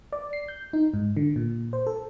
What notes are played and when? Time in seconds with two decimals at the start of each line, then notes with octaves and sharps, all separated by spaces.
0.13 D5
0.33 C7
0.48 G6
0.73 D#4
0.94 G#2
1.17 D3
1.36 A#2
1.73 C5
1.87 A4